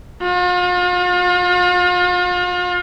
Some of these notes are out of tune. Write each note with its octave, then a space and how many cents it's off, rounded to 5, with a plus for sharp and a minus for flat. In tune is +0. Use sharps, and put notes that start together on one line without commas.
F4 +40